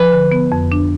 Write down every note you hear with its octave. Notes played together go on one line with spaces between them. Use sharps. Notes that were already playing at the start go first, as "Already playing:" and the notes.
Already playing: F3 B4
D3
B3
F2
D4